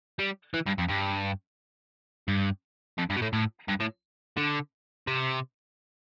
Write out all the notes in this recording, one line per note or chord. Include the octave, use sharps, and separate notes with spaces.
G3
E3
G2
F2
G2
G2
F2
G2
B2
A2
A2
G2
A2
D3
C3